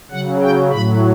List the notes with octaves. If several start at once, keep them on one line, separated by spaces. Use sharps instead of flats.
C#3 F#3 F#5
G5
A2 F#3 B5